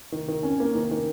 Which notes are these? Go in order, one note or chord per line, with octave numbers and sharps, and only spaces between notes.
D#3
D#3
C#4
A#3
D#3
D#3